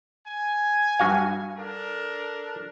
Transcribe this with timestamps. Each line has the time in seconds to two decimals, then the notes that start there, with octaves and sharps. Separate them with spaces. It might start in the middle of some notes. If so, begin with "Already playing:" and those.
0.27 G#5
0.99 G2 F#4 F5
1.58 D4 A4 A#4